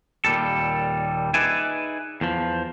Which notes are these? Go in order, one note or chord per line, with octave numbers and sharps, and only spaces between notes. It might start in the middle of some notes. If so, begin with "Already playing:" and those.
D#2 A#2 G3 A4
D#4 G#4 B4 D5 E5 G#5
E2 F3